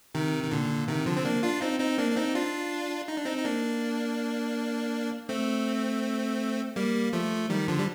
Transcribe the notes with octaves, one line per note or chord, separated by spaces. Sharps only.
C3 D#3
D#3
A#2 D3
C3 D#3
D3 F3
C4
A#3 D4
D4 F4
C4 D#4
C4 D#4
A#3 D4
D4
C4 D#4
D4 F4
D#4
D4
C4 D#4
D#4
A#3 D4
A3 C4
G3 A#3
F3 A3
D#3 G3
D3 F3
G3